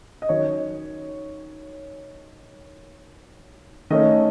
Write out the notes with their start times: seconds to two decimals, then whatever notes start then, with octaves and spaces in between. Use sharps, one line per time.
0.22 D#5
0.29 D#3 F#3 C#4 C#5
3.90 D#3 A3 C#4 D#5